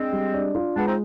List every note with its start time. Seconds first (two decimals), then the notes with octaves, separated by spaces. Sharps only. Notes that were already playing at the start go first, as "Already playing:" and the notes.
Already playing: G#3 C4 D4
0.13 G3
0.34 D4
0.55 F4
0.75 G#3 B3 D4
0.86 C4 D#4